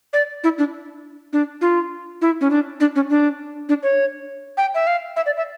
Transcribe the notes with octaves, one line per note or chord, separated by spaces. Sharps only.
D5
E4
D4
D4
F4
E4
C#4
D4
D4
C#4
D4
D4
C#5
G5
E5
F5
E5
D5
E5